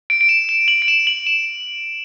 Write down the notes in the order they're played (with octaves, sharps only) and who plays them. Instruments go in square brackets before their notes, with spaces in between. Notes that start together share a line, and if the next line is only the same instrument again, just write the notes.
[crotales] D7
D7
E7
E7
F#7
D7
E7
F#7
E7